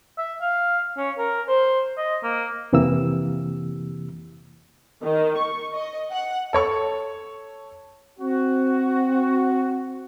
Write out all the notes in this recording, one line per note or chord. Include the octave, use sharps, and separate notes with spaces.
E5
F5
C#4
A#4
C5
D#5
A#3
F2 C3 E3 A#3 G4 E6
D#3
C#6
D#5
F#5
A4 C#5 C#6
C4 F#4